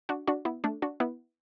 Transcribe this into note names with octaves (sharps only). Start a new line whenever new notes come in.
D4 F#4
D4 F#4
B3 E4
A3 D4
D4 F#4
B3 E4